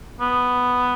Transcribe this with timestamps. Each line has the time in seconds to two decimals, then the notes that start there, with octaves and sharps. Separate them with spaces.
0.20 B3